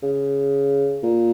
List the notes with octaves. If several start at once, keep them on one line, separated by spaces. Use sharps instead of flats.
C#3
A#2